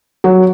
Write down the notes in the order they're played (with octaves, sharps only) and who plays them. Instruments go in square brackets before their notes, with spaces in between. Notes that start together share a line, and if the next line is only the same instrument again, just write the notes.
[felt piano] F#3